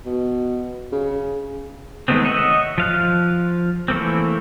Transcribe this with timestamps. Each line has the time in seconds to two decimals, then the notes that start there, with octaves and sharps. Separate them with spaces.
0.06 B2
0.92 C#3
2.08 D#3 G#3 A3 B3 C4
2.25 C#5 D#5 E5 F#5
2.78 F3 F5 F#6
3.88 E3 A3 A#3 C4